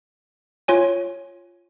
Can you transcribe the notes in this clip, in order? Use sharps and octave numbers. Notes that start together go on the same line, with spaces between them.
F4 C#5 G#5